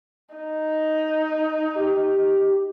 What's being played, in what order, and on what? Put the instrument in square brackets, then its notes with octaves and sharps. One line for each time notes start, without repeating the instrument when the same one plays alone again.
[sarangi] D#4
[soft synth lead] G4